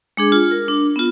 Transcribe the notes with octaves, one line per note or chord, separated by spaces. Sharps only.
G#3 D4 G#4
F4
A#4
D4
B3 F4